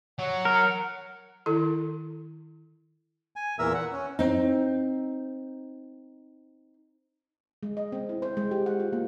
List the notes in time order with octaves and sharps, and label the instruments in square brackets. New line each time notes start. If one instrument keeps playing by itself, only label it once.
[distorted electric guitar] F#3 [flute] F#5
[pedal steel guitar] A#4
[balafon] D#3 E4 A4
[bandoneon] G#5
E2 A#2 E3 A#4 E5 E6
F#5
C#4
[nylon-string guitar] C4 D#4
[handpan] G#3
D#5
C4
E4
C5
G#3
G4
F#5
F4
A#3